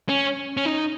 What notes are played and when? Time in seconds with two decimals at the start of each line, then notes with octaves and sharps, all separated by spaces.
0.09 C#4
0.57 C#4
0.65 D#4